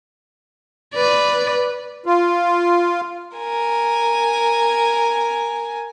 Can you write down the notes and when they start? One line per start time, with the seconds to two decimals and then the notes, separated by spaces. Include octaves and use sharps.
0.95 B4 D5
2.06 F4
3.37 A#4 G#5